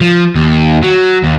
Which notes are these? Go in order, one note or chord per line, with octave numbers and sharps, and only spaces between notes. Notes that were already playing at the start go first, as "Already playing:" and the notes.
F3
D#2
F#3
D#2